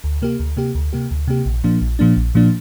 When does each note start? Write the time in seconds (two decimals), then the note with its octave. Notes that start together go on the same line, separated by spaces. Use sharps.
0.04 D2
0.22 C3 A#3 G4
0.40 D2
0.57 C3 A#3 G4
0.75 D2
0.93 C3 A#3 G4
1.11 D2
1.28 C3 A#3 G4
1.46 A#1
1.64 A#2 F3 A#3 D4
1.81 A#1
1.99 A#2 F3 A#3 D4
2.17 A#1
2.35 A#2 F3 A#3 D4